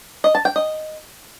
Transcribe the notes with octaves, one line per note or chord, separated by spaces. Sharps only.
D#5
A5
G5
D#5